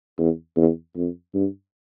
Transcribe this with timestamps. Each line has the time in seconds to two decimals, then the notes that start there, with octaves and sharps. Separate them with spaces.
0.18 E2
0.57 E2
0.96 F2
1.34 G2